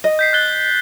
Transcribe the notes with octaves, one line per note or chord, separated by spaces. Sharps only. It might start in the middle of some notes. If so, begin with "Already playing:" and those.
D#5
G6 B6 C7
F#6 A6 G7